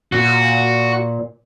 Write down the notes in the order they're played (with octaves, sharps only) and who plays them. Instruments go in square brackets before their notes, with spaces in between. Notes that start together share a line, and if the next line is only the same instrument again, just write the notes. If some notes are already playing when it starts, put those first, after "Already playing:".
[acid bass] A#2 [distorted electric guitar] F#4